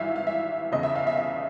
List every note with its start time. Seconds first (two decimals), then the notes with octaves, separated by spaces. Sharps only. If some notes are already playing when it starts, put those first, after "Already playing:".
Already playing: G#1 G#2 E3 G3 E5 F5
0.16 F5
0.27 E5
0.71 F1 E2 C#3 D#5
0.83 E5
0.95 F5
1.07 E5
1.17 E5